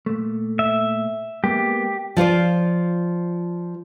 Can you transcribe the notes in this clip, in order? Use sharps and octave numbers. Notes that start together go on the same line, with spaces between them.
A#2 A3
E5
G#3 A#3 B3 G4
F3 F4 C5 D5